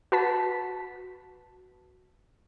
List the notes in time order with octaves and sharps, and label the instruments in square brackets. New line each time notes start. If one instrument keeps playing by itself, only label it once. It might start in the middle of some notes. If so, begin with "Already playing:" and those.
[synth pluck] F#4 B4 A5 B6